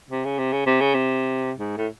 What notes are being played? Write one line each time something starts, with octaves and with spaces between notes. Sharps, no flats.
C3
C#3
C3
C#3
C3
C#3
C3
G#2
A2